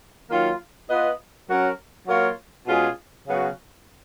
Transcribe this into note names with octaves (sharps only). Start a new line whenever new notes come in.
D#3 F#3 A#3 F4
B3 F4 B4 D#5
F#3 C#4 F#4 A#4
F#3 A#3 F4 A#4 C#5
B2 G#3 C#4 F4 G#4
C#3 F#3 B3 F#4